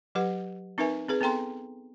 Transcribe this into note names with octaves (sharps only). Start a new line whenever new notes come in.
F#3 G4 B4 F#5
C4 D#4 A#4 B4 E5 G#5
C4 G#4 B4
B3 C4 A4 G5 A#5 C6